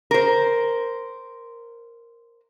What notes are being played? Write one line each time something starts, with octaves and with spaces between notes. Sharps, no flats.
A#4 C5